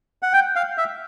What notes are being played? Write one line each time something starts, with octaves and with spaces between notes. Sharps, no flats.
F#5
G5
F5
E5